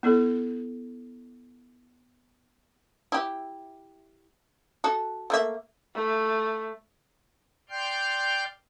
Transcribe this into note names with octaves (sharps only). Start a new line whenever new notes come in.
B3 E4 A4
E4 G4
F#4 A4
A3 A#3 E5
A3
D5 G5 C6 F6 G6